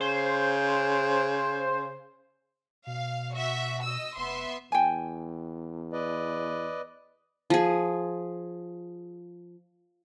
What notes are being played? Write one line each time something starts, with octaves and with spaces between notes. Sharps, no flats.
C#3 C5
B2 F5
F#4 E5
D#5 E6
F1 B3 E5 C6
E2 G5 G#5
B4 D5 D#5
F3 G#4